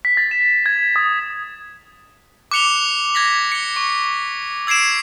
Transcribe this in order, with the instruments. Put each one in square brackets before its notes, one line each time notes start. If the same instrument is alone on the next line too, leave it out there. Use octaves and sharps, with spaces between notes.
[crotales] B6
A6
E7
G#6
D#6
D6 F#6 C#7 F7 G7
G#6 A#6 B6 F#7
C#7 G7
C#6
E6 G#6 C7 D7 E7